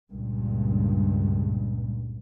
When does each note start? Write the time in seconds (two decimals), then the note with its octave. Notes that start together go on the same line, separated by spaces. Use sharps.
0.12 C#2 G2 A#2